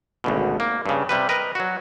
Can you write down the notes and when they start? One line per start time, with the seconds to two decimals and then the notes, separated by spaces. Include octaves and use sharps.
0.24 G#1 D2 B2
0.60 A#3
0.86 G2 C#3
1.09 C3 G3 B4
1.29 A#4 B4 D#5
1.55 F#3 F#4